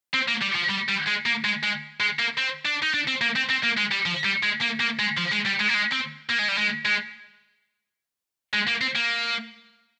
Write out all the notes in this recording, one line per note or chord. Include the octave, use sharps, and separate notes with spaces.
C4
A#3
G3
F3
G3
G3
G#3
A#3
G#3
G#3
G#3
A#3
C4
D4
D#4
D4
C4
A#3
C4
C4
A#3
G#3
G3
F3
G3
G#3
A#3
A#3
G#3
F3
G#3
G3
G#3
A#3
G#3
C4
A#3
G#3
G3
G#3
G#3
G#3
A#3
C4
A#3